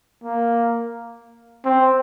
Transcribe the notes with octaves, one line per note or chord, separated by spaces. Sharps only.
A#3
C4